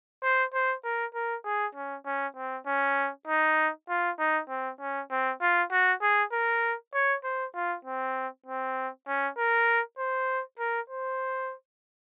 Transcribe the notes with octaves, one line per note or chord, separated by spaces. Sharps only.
C5
C5
A#4
A#4
G#4
C#4
C#4
C4
C#4
D#4
F4
D#4
C4
C#4
C4
F4
F#4
G#4
A#4
C#5
C5
F4
C4
C4
C#4
A#4
C5
A#4
C5